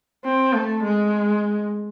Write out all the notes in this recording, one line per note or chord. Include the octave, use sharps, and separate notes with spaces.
C4
A3
G#3